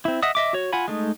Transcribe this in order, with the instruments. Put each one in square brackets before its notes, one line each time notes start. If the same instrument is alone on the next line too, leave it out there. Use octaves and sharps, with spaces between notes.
[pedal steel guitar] C4 E4
D#5 E5 F#5 D#6
D#5 E5 D6
F#4 C#5
F4 F#5 G#5 B5
G#3 A3 D#4